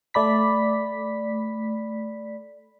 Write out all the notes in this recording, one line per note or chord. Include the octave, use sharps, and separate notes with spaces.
A3 D5 B5 B6